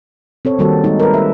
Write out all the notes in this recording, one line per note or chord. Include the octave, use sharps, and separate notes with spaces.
C4 A4 C#5
D#3 G3 A#3 F#4 A4
G#3 D#4
A#4 B4
A4 E5